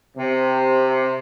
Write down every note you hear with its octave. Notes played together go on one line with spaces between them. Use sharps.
C3